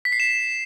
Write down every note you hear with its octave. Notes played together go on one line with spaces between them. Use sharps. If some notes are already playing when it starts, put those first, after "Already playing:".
B6
C7
E7